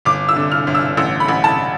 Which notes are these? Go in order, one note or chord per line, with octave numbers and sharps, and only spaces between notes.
G1 D6
E6
D3
F6
G1
E6
A1 E6
B5
A1
A5